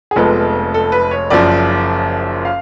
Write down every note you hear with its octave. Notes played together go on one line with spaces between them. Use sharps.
G#4
F1 F2 F3 G#3 B3 A4
A4
B4
C#5
F#1 F#2 F3 D5
F5